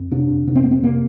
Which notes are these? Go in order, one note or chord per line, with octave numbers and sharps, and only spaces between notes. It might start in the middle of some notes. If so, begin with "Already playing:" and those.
Already playing: F2
C3 D4
F2
C3 D4
C4
F2 A#3
C4
C3 A#3